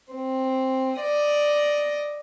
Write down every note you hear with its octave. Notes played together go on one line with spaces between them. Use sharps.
C4
D5 D#5